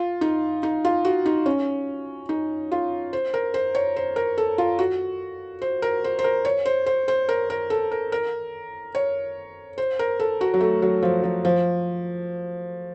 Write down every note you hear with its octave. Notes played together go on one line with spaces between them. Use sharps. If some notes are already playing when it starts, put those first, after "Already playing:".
Already playing: F4
D#4
D#4
F4
F#4
D#4
C#4
D#4
F4
C5
A#4
C5
C#5
C5
A#4
A4
F4
F#4
C5
A#4
C5
C5
A#4
C#5
C5
C5
C5
A#4
A#4
A4
A#4
A#4
C#5
C5
A#4
A4
F#4
F#3
A3
F#3
F3
F3
F3